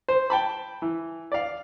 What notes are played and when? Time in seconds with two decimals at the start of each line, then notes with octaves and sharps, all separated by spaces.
0.08 C5
0.30 G5 A5 B5
0.82 E3
1.32 D5 F5